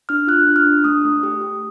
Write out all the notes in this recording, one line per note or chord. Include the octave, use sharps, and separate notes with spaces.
D4 F6
F4 F#6
D4
F6
D4
A3 D#6
A3
G4
G4